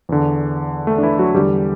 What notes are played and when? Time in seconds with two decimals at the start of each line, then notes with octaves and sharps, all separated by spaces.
0.09 E2 D3
0.87 A3
0.98 D4
1.03 E3 E4
1.19 F#3 F#4
1.35 E2 D3 G3 G4